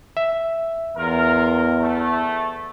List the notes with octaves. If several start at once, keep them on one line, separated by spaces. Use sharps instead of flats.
E5
E2 A#3 F4 A#4
A3